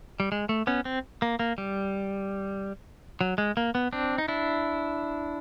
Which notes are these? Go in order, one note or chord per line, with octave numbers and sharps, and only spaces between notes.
G3
G#3
A3
B3 C#4
C4
A#3
A#3
G3
F#3
G#3
A#3
B3
C4 D4
D#4
D4 E4